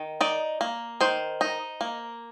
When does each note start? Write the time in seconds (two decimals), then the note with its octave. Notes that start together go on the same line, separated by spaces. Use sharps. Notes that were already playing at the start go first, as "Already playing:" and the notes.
Already playing: D#3
0.21 D#4 D5
0.61 A#3
1.01 D#3 C5
1.41 D#4
1.81 A#3